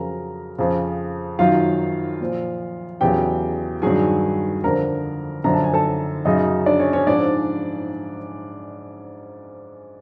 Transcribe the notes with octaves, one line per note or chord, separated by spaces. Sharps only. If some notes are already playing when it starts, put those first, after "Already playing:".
Already playing: F2 C#3 F#3 A#4 A#5
F2 C#3 F3
F#2 D#3 F#3 F4 F5
A#2 F3
E2 C#3 F#3 G4 G5
G2 D#3 F#3 G#4 G#5
F2 D3 F3 A#4 A#5
F#2 D3 F3 A#5
A5
G#5
A4 A5
F#2 C#3 F#3 D#4 D#5
D4 D5
C#4 C#5
C#4 C#5
G#2 F3 D4 D5